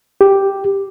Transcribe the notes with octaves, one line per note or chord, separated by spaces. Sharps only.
G4